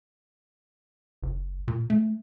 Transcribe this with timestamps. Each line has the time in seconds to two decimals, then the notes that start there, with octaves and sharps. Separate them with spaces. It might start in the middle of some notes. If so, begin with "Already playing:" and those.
1.22 F#1
1.68 A#2
1.90 A3